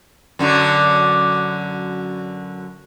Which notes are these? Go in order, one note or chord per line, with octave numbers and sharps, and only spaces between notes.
F#2 D3 F#3